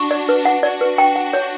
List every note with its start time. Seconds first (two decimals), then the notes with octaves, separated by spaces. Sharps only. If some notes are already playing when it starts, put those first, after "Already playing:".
Already playing: D4 F#4 C#6
0.11 D5
0.29 B4
0.45 F#5
0.63 D4 F#4 D5
0.81 B4
0.98 G5
1.16 F#5
1.33 C#5